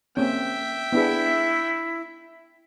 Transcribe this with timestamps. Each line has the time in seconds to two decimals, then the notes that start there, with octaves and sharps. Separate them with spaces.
0.17 A#3 C4 C#4 E5 G5
0.92 B3 D4 E4 G#4